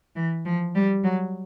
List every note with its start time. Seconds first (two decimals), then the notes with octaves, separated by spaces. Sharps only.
0.16 E3
0.45 F3
0.75 G3
1.04 F#3